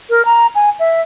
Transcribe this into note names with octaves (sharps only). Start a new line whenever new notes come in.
A#4
A#5
G#5
E5